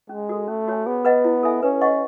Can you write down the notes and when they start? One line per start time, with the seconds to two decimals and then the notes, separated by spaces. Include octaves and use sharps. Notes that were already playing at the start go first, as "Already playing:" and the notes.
0.09 G#3 C#4
0.29 F#4 A4
0.47 A3 C#4
0.68 F#4 C#5 G#5
0.86 B3 G#4
1.05 B4 D#5 F#5
1.24 E4
1.43 A4 E5 G#5
1.62 C#4 B4
1.81 D#5 F#5 C#6